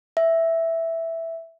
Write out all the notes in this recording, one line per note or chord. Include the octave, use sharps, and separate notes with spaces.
E5